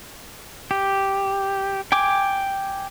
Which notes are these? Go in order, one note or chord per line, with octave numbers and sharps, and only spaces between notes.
G4
G5 G#5 D6